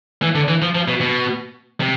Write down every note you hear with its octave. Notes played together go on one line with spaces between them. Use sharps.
E3
D3
E3
F3
F3
B2
B2
C3